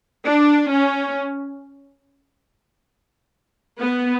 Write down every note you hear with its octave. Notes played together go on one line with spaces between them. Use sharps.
D4
C#4
B3